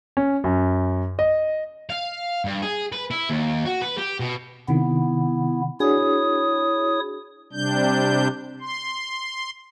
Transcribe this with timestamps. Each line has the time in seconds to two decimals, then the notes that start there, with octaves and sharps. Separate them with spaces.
0.17 C#4
0.44 F#2
1.19 D#5
1.90 F5
2.45 G2
2.63 G#4
2.93 B4
3.11 E4
3.30 D#2
3.65 F#4
3.81 B4
3.98 G4
4.20 B2
4.68 C3 D#3 B3 E4
5.80 D4 E4 F#4 G#4 C#5 D#6
7.53 C3 G3 D4 G6
8.61 C6